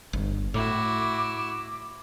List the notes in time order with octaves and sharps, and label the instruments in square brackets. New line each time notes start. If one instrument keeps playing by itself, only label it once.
[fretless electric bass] G1
[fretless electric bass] A2 [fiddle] E4 F#4 [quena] D6